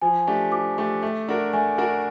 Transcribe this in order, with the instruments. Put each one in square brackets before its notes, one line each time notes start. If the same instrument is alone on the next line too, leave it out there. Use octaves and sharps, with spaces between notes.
[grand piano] F3 [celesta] G#5
[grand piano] A3 D4 G4
[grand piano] F3 [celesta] D6
[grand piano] A3 D4 G4
A3
D4 F#4 A#4
[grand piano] A3 [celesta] G#5
[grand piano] D4 F#4 A#4